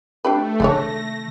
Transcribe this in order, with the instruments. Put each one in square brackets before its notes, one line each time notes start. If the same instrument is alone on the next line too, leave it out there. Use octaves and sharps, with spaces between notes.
[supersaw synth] A3 [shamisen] D4 G4 B4
[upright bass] C3 D#3 [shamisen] G#3 D4 C#5 [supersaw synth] A#6